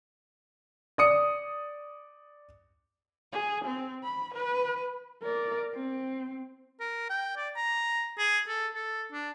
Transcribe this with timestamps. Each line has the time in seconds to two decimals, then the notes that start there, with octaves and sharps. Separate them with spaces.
0.98 D5 D#6 C#7
3.32 G#4
3.65 C4
4.04 B5
4.34 B4
5.22 A#4 D5
5.75 C4
6.80 A#4
7.10 G5
7.36 D5
7.56 A#5
8.18 G#4
8.48 A4
8.74 A4
9.12 D4